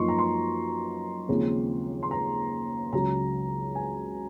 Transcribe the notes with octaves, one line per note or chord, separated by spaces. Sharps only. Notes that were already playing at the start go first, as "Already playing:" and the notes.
Already playing: F#2 F3 A#3 D#4 C6 C#6
A#5
C6
D#2 C#3 F3 G#3 C4
C6
A#5
C#2 C#3 F#3 A#5
G#5